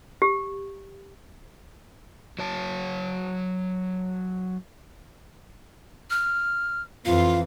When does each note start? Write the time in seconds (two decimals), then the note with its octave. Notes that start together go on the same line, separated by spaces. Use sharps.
0.22 G4
2.39 F#3 C#5 A5
6.10 F6
7.06 F2 E3 F4 F5